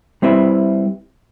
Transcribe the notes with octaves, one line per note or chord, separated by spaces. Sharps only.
G3 C4 E4 B4 E5